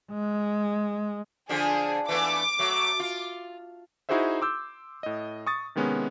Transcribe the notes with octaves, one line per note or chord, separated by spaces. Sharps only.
G#3
D3 F3 D4 G#4
E3 A3 B3 D6
F#3 A3
F4
D#4 E4 F#4 G#4 C5 E5
C6 D6 E6 G6
A2 D#5
C#6 D#6 A6
C3 D#3 G#3 B3 C#4